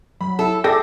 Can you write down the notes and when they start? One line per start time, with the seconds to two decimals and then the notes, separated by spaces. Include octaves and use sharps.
0.21 F#3 B5
0.39 E4 A4
0.64 G#4 A4 D5 E5 G5 D6 A#6